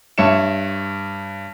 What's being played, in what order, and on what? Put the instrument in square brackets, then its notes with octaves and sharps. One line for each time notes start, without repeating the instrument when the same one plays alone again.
[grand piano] G2 C#5 E5 C#7 E7